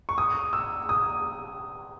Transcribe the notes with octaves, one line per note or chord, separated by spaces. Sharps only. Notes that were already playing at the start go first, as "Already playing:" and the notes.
C#6
D#6
E6
D#6